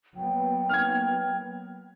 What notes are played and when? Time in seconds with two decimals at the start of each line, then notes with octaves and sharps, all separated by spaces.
0.17 F#3 A#3 B3 G5
0.69 F6 G#6